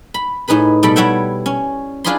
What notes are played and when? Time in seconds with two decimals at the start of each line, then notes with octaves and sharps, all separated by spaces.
0.14 B5
0.48 A2 D#4 G#4 B4 B5
0.83 B2 G3 A4 G5 B5
0.96 G3 E4 C#5 E5 F#5 G5
1.46 C#4
2.04 D4 F4 G#4 D#5 B5 C6